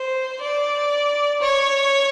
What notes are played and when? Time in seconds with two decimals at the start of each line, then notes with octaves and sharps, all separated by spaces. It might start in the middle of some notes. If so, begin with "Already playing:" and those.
Already playing: C5
0.41 D5
1.42 C#5